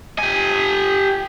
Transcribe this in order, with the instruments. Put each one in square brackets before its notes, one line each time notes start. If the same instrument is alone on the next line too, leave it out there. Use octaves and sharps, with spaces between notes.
[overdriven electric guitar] G4 G#5